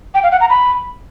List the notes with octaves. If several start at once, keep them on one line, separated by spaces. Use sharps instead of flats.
G5
F5
F#5
A#5
B5